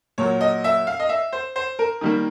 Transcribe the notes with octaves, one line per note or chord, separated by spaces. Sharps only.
A#2 F#3 A#3 C#5
D#5
E5
F5
D#5
E5
C5
C5
A#4
D#3 G3 A#3